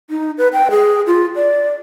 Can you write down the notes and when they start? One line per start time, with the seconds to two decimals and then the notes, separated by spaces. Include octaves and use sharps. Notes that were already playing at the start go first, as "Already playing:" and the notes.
0.10 D#4
0.38 B4
0.53 G5
0.71 G#4
1.07 F4
1.36 D5